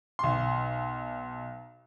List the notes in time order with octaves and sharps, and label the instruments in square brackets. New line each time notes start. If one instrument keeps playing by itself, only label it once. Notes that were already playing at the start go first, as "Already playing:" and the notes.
[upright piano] B1 C6